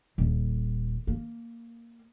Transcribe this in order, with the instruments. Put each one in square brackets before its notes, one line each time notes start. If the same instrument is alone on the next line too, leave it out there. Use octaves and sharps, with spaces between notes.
[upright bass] D#1
A#3